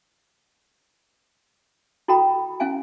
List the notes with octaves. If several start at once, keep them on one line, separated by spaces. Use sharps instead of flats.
E4 F#4 A4 G5 A#5 B5
C#4 E4 F5 G#5